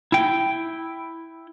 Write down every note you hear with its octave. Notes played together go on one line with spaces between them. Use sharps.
E4 G5